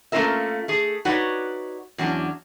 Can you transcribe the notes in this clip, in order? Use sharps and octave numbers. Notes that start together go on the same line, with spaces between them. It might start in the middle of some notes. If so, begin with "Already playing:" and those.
A3 A#3 C#4 F4 A#4 E5
A3 G#4
D#4 F#4 B4 C#5 D5 F#5
E2 F#3 C#4 D4